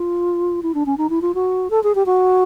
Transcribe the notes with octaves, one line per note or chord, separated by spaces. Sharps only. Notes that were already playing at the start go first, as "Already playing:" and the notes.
Already playing: F4
E4
D4
C#4
D#4
E4
F4
F#4
A4
G#4
G4
F#4